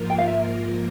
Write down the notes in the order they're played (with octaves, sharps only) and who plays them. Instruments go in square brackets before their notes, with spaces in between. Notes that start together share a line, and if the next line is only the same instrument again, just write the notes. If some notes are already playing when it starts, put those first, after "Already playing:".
Already playing: [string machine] G#2 F3 A#3 F4 A#4
[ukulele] G5
F5
E5